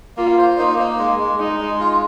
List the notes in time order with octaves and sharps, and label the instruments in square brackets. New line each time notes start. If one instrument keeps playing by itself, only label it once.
[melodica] A#3 [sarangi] F4
[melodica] C5
[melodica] A#3 [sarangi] D#4
[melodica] A#3
G#3
G#3
[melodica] G#3 [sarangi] D#4
[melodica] G#3
F4